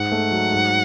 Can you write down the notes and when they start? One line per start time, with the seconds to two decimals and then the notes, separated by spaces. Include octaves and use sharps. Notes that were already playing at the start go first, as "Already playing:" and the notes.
Already playing: G#2 F#5
0.12 A3
0.31 F#3
0.52 G#2